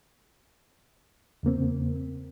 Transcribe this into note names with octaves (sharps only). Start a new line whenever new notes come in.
E2 C#3 A#3 C4